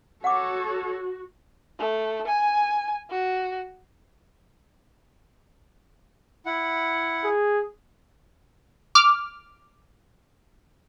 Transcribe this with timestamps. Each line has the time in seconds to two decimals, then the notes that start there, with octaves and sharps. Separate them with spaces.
0.24 F#4 A4 C#5 F#5 D6
1.78 A3
2.27 G#5
3.10 F#4
6.46 E4 F#5
7.25 G#4
8.95 D6 F6